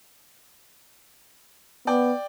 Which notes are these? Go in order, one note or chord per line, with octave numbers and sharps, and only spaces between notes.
B3 D5 G5